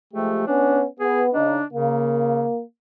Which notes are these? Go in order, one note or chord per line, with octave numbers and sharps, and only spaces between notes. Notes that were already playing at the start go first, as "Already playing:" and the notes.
F3 G#3 A3 G4
B3 C#4 D4
B3 G#4
C#3 D4 D#4
C#3 A#3